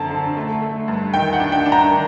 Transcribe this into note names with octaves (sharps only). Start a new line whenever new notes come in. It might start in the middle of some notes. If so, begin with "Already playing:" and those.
Already playing: F#2 D3 C4 A5
D3
A3
A3
G2
D#3 G5
F#5
D4
G5
D4
A#5
D#3